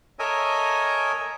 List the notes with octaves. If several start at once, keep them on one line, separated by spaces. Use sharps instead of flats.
A4 A#4 C#5 D#5 E5 G#5